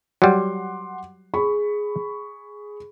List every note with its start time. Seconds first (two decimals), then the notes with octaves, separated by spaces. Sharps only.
0.22 F#3 G3 F#5 C6 D6
1.34 G#4 B5 C#6